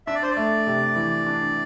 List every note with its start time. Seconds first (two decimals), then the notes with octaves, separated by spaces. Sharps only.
0.07 D4 E5
0.15 D5
0.23 C5
0.30 D5
0.37 A3
0.67 C3
0.96 E3
1.26 D4